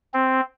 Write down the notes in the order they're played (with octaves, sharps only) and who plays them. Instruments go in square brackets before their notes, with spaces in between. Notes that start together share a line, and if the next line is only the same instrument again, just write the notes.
[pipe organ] C4